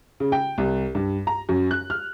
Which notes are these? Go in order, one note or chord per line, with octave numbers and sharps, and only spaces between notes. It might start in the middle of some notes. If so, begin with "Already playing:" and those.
C#3
G5
C2
G2
A#5
F#2
F#6
F6